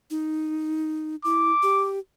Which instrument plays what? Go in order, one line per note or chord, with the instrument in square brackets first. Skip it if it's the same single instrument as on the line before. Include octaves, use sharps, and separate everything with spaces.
[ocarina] D#4
[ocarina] E4 [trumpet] D6
[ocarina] G4